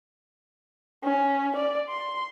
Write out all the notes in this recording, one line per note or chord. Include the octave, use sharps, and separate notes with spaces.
C#4
D5
C6